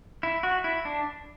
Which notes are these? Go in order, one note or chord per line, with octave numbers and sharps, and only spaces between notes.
E4
F#4
E4
D4